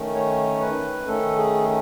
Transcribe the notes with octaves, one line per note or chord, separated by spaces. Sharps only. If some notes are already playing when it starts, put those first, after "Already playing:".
Already playing: D#3 A3 C#4
C#5
B4
D#3 A3 C#4 A4
G#4